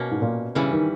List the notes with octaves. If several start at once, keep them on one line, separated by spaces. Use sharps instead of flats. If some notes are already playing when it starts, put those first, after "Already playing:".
Already playing: B2 A#3 C#4
G#2
A#2
G2 C#3 E3 G3 C#4
D#3